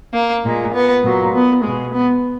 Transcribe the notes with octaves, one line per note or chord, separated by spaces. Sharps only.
A#3
A#2 G#3
B3
A#2 F#3
B3
B2 G#3
B3